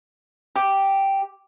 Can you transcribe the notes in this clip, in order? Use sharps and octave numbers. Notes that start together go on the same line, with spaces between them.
G4